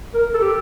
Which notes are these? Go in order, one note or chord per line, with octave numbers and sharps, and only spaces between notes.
A#4
A4
G4